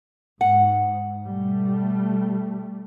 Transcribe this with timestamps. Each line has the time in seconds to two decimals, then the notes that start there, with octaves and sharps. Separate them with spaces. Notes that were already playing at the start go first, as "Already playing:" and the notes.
0.41 G#2 F#5
1.25 B2 G3 A3